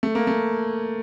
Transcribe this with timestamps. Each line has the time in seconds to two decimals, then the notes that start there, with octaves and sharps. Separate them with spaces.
0.03 A3
0.15 A#3
0.27 A3